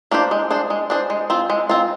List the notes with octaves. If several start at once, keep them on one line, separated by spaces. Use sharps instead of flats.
A#3 D4 G4 C5
G#3
D4 G#4 C5
G#3
D4 G#4 C5
G#3
C4 F4
G#3
C4 F4